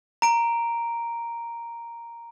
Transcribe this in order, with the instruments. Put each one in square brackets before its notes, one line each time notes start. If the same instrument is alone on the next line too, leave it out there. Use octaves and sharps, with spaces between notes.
[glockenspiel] A#5 D7